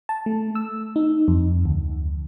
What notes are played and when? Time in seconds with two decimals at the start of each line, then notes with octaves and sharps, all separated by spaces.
0.09 A5
0.26 A3
0.55 E6
0.96 D#4
1.28 F2
1.65 D2